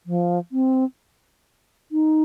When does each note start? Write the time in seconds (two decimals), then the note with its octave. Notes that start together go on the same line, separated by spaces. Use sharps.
0.06 F3
0.52 C4
1.92 D#4